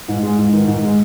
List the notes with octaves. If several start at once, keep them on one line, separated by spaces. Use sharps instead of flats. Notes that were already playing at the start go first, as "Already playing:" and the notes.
G#2
G#3
G#2
D#3
G#2
G#3